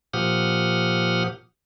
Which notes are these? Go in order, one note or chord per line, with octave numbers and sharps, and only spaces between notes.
A#2 F3 G4 F#5 D#6 F6